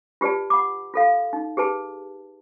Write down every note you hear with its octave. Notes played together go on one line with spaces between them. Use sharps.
F4 G4 B4 D5 A5
F#5 B5 D6
F4 A4 F5
D#4
G4 G#4 B4 A5